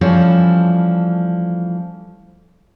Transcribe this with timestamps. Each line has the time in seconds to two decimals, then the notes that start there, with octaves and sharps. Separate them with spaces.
0.01 E3 F3 G3 A3 C#4